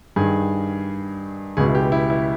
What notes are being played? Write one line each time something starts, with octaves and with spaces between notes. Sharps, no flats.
G2 D#3 G#4
C#2 B2 G#4
E4
G4
E4
E4